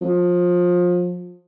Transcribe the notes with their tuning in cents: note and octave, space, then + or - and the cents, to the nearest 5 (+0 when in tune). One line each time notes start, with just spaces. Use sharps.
F3 +25